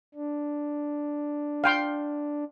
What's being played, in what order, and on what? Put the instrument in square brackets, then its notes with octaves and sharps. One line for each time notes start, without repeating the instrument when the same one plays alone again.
[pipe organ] D4
[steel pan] F5 G5 C6